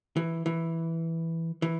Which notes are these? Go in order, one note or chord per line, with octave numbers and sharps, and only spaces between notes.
E3
E3
E3